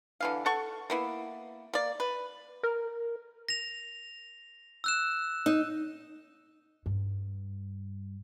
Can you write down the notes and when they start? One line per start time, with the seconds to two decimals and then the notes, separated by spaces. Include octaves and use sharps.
0.20 D3 E3 F5
0.46 A4 F#5 C#6
0.90 A#3 B3 E4
1.73 A#3 D5
2.00 B4
2.63 A#4
3.49 A#6 F7
4.84 E6 F#6 E7
5.46 D#4
6.86 G2